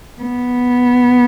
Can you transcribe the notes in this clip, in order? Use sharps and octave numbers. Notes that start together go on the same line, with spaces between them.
B3